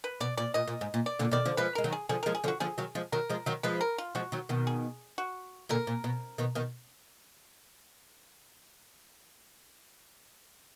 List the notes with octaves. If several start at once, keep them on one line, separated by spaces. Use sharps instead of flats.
B4
B2 D5
A#2 D5
A#2 D#5
A#2
G#2
A#2
D5
A#2 D3
B2 D#3 D5
D3 F3
F3 G#3 B4
G#3 A#4
D#3 F#3
G#4
D3 F3 G#4
F3 G#3 A#4
G#4
D3 F3
F#4
D3 F3 G#4
D#3 F#3
F3 G#3
D#3 F#3 A#4
F3 G#3
D#3 F#3
F3 G#3 B4
A#4
F4
F3 G#3 F#4
D#3 F#3
B2 D#3
G#4
F#4
A#2 D3 A#4
A#2
B2
B2 D#3
B2 D#3